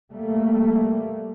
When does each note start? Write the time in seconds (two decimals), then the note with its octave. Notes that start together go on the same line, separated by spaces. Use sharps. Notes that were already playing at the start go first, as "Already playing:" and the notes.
0.10 G3 A3 A#3